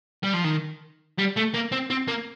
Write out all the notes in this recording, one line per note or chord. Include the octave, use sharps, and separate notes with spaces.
G3
F3
D#3
G3
A3
A#3
C4
C4
A#3